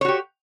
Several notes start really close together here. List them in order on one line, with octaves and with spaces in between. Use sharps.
C#5 F#4 G4